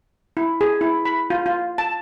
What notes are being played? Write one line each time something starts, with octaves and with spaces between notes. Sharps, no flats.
E4
G#4
E4
B5
F4
F4
A5